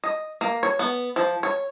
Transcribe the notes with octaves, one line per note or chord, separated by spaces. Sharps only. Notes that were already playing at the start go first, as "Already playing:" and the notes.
D#5
A#3
C#5
B3
F3
C#5